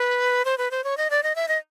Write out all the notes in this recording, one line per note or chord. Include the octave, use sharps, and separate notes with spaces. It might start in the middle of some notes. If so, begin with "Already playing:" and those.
Already playing: B4
C5
B4
C5
C#5
D#5
D5
D#5
E5
D#5